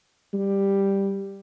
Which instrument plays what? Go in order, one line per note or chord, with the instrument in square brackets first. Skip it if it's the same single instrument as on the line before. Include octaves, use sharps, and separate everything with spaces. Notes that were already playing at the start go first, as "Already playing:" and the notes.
[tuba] G3